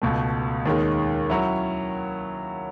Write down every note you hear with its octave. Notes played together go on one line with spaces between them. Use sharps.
C#2 B2 A3
D#2 D#3 G#3 C#4
F#3 C#4 E4